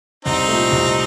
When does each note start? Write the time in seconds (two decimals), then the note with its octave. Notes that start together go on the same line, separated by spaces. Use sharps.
0.25 C2 C4 D#4
0.48 A#2 A3
0.71 C2